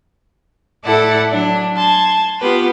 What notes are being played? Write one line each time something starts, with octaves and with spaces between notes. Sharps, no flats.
A2 E4 A4 D5 F#5 A5
F#3 D4
A5 C6 G#6
B3 F4 G4 B4